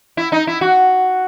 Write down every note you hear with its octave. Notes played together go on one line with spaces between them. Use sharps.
E4
D#4
E4
F#4